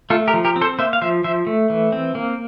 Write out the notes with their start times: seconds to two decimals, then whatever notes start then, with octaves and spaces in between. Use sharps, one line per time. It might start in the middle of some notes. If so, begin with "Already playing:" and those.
0.10 A3 F4 A4
0.28 G4 A#4
0.34 F3
0.45 G4 A#4
0.56 C4
0.61 A4 C5
0.79 A#3 C5 E5
0.93 F5
1.01 F3 C5 E5
1.24 F3 C5 E5
1.47 A3
1.70 E3
1.92 C4
2.15 A#3